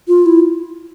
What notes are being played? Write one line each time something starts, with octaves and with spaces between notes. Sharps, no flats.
F4
E4